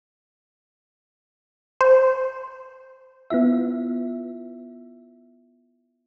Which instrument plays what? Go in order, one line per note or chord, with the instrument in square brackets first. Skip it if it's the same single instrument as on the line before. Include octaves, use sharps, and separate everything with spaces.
[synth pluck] C5
B3 E4 F4 E5